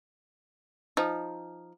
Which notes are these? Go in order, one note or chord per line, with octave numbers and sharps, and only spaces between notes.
F3 D#4